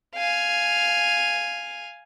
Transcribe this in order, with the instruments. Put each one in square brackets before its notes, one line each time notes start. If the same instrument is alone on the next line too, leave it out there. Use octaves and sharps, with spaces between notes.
[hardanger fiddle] F5 G#5